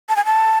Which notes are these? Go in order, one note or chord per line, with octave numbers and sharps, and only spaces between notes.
A5
G#5
A5